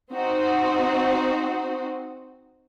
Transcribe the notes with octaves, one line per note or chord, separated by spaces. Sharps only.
C4 D#4 F#4 C5